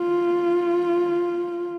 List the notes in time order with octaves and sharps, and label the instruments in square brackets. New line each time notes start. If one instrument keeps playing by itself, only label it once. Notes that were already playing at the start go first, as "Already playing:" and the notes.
Already playing: [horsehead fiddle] F4